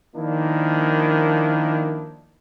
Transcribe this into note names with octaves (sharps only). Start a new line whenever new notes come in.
D#3 F3 A#3 D4 E4